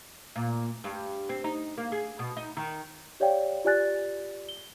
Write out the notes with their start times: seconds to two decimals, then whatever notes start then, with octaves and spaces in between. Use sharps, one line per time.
0.36 A#2
0.84 G2
1.29 C4
1.44 D#4
1.78 A#3
1.92 G#4
2.19 B2
2.37 D#4
2.57 D#3
3.20 G4 C#5 D5 F5 G5
3.64 F4 G4 D5 G#5 F#6 A6
4.49 G7